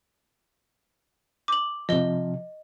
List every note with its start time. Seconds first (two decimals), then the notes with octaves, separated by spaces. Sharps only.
1.48 D6 F#7
1.89 C3 F3 D#5 G7